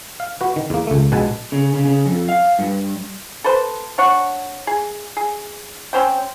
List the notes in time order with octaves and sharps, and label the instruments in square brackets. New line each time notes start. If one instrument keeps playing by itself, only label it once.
[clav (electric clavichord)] F5
F#4 B4
D#3
E2 A#3
C#2 A3
A#1 B2 G#3 B4 G#5 A5
[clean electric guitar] C#3
C#3
C#3
F2
F5
G2
[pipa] A4 B4 C5
D4 C#5 F#5 C#6
G#4
G#4
C4 C#4 C5 G5